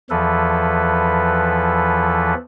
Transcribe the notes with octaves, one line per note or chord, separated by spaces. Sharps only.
E2 E3 F3 A4 B4